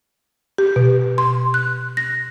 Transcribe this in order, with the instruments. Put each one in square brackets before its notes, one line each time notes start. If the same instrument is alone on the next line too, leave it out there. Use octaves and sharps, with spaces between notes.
[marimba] G4
B2
C6
F#6
A#6